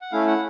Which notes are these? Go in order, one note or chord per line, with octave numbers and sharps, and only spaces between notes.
F#5
A3 C#4 E4 F5
F#5